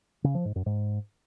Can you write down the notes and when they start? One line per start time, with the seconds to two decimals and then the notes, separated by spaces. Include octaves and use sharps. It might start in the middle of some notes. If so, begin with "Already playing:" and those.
0.24 C#3
0.35 F3
0.45 G#2
0.56 F#2
0.66 G#2